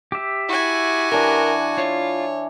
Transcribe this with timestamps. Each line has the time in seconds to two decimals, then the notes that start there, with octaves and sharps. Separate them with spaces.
0.12 G4 E5
0.49 E4 F#4 G#5
1.11 E3 D4 A#4
1.77 F4 C#5